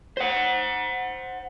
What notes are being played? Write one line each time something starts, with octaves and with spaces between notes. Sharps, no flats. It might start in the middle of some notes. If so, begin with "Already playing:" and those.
C5 F#5